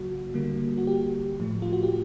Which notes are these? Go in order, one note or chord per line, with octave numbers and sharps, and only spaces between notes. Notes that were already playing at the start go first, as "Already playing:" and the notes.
Already playing: C#3 F#3 A#3 F#4
D3 G3 A#3
F#4
G4
A2 F3 A3
F4
F#4
G4